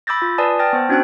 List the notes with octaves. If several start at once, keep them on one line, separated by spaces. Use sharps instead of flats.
B5 D6 E6 G6 A6 A#6
F4
B4 D5 G#5 A5 D#6
G5 A5 F6 A6 A#6
B3 C5
C#4 D4 F#4 C5 G5 F#6